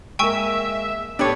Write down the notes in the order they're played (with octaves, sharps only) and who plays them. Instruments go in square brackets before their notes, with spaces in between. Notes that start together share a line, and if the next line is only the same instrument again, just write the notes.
[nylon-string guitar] G#3 A#3 A#4 [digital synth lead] E5 [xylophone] G5 G#5 C#6
[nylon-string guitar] A2 A4 [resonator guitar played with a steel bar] B3 G4 C#5 [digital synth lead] D4